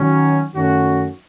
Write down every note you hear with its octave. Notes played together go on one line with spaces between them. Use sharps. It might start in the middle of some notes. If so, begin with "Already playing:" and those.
Already playing: D#3 F#3 C#4
F#2 D#3 A3 C#4 F#4